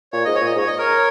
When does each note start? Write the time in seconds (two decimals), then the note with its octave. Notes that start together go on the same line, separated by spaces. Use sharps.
0.13 A#2 C#5
0.25 G#2 D#5
0.35 C#5
0.41 A#2
0.46 D#5
0.55 G#2 C#5
0.67 D#5
0.79 A#4 C#5